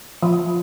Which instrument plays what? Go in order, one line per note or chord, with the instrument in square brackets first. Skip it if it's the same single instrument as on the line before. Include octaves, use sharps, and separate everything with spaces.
[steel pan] F3